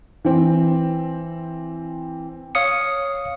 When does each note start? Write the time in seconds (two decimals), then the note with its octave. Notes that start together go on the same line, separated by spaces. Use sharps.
0.25 E3 C4
2.55 C#5 F5 D#6 C#7